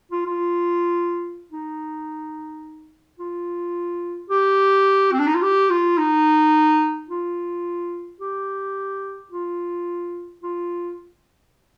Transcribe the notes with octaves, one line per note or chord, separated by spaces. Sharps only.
F4
F4
D#4
F4
G4
C4
D4
D#4
F4
G4
F4
D#4
F4
G4
F4
F4